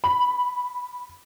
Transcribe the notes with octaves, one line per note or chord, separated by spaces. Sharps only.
B5